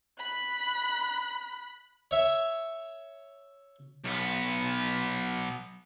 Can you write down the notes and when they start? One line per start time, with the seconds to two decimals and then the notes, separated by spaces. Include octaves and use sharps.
0.20 B5 F#6
2.11 C#5 E5
4.04 B1 B3